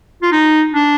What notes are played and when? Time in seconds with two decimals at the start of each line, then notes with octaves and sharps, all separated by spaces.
0.22 F4
0.32 D#4
0.74 D4